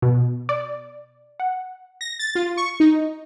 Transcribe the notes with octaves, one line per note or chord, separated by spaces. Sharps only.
B2
D5
F#5
A#6
A6
F4
C#6
D#4